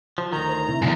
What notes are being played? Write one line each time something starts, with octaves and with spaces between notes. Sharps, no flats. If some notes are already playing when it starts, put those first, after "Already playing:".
F3
D2 D#3 A#5
C5
C3 E4
B1 E2 G#2